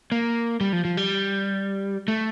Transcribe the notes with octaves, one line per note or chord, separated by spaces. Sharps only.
A#3
G3
F3
F3
G3
A3